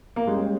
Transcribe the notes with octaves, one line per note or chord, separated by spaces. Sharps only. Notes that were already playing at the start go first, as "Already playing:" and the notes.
A#3
G3 G#3 C#4 G4